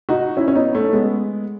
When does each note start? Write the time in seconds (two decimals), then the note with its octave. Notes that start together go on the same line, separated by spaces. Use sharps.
0.09 D#4 F#4
0.37 C#4 E4
0.48 C#4
0.55 B3 D#4
0.74 A3 C#4
0.93 G#3 B3